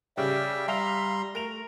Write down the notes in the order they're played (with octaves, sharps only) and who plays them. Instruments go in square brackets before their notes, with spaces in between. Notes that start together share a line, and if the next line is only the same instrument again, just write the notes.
[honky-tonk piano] C#3 G3 [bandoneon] D5 E5 G5
[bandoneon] G3 A#5 C6 [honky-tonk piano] E5 F5 F7
[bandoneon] A3 [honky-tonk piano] A#4 F7